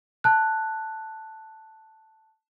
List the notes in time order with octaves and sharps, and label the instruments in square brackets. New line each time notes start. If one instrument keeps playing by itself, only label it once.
[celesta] A5 F#6